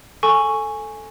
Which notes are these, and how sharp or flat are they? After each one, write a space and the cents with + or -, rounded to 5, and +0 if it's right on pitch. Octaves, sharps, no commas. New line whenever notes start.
A4 +0 G#5 +0 C#6 +0